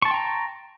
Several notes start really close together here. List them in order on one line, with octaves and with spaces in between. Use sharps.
C#6 A5 C6 G5 A#5